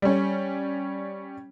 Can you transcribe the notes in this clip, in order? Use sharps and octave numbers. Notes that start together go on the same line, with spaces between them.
G3 C#4